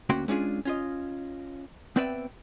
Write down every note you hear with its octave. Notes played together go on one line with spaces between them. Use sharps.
D2 A#3 C#4 F#4 G5 C6
G#3 C#4 D4 F4 G#4
C#4 F4 D#5
B3 C4 B4 D5 E5 G5